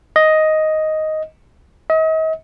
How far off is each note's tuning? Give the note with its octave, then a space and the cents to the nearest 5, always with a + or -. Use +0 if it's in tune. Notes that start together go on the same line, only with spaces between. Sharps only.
D#5 +5
D#5 +40